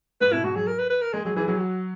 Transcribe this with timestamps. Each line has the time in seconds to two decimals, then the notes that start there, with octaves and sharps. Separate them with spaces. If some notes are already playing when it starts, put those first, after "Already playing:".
0.21 G#2 B4
0.32 B2 E4
0.44 G#2 F#4
0.56 F#3 G#4
0.67 A#4
0.79 B4
0.90 B4
1.02 A#4
1.13 G#3 G#4
1.25 F#3 G#4
1.36 E3 G#4
1.48 F#3 G#4
1.59 F#4